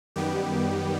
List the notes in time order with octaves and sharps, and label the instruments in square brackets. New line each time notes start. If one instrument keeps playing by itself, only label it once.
[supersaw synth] F#2 D#3 G3 B3 G4